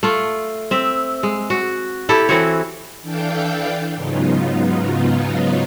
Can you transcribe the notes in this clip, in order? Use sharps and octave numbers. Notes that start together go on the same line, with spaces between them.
A3 F4
C4 E5
G#3
F#4
E4 G4 A4
E3 C4 F#4 C#5
E3 D4 A4 F5 G5 G6
G#2 C#3 F#3 B3 D#4 F4